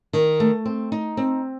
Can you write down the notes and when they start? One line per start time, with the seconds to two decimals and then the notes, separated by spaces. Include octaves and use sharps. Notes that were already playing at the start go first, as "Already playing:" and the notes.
0.13 D#3
0.40 A3
0.66 C4
0.92 D#4
1.17 C4